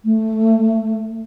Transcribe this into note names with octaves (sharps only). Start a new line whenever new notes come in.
A3